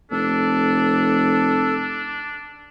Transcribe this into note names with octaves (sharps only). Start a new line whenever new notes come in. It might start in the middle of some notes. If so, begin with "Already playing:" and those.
F1 D4 A4